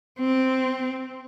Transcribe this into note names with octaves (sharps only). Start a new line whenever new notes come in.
C4